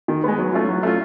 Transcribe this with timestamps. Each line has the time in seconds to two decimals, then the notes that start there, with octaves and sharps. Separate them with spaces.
0.08 D#3
0.24 G#3 B3
0.38 F#3
0.53 A3 C#4 F4
0.69 F#3
0.83 A3 C#4 F4